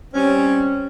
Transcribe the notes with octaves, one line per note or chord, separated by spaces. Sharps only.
G3 C4 C#4